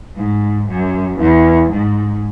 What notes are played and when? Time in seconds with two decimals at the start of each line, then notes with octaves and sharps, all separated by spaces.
0.16 G#2
0.68 F#2
1.19 E2
1.71 G#2